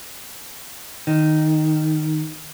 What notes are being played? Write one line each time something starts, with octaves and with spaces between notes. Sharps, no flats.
D#3